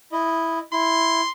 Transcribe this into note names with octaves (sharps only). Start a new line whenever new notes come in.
E4 D#5
E4 C6